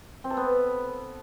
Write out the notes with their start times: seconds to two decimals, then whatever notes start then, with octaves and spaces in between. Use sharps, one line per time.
0.24 C4
0.30 A4
0.37 B3